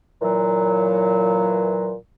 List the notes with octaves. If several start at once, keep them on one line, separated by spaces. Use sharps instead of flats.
A#2 E3 F#3